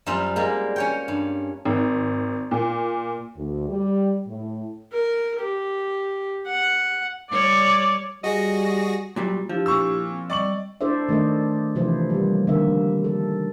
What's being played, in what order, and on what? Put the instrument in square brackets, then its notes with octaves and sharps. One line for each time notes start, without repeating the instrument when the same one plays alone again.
[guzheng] F#2 G3 C4 F4
G3 G#3 A#3
C#4 C#5 G5
G2
[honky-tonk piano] G#1
A#2
[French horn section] D2
G3
A2
[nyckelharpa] A#4
G4
F#5
[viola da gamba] G3 C#5 [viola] D5
[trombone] G3 [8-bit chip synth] F#4 G#4 A#6 [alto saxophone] D#5
[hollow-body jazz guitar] A#2 F#3 G3
[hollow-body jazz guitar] F3 [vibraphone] D4 E4 G4
[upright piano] A#2 C#6 E6
[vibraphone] C4
[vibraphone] G3 D#5 [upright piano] D5 C#6 F#7
[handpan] D4 E4 A4 C5 D5 E5
D#3 A3 D4 A4 D#5
C3 E3 F3 E4 C5
G3 A#3
D3 D#3 A#3 E5
A4